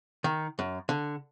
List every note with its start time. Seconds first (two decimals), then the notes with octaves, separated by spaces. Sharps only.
0.24 D#3
0.59 F#2
0.89 D3